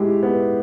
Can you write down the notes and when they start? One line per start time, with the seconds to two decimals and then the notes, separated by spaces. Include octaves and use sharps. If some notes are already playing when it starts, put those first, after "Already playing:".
Already playing: G#3 E4 G4
0.23 B3